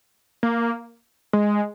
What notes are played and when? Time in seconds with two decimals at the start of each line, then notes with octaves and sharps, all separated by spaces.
0.43 A#3
1.33 G#3